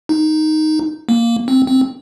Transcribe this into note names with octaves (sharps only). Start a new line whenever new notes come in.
D#4
A#3
C4
C4